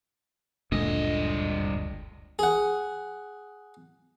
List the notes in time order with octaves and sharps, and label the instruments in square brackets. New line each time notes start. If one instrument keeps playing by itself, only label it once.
[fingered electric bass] F#1 D2 G#3 [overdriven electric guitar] G2 D#5 [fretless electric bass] A#2 D3
[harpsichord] G#4 F#5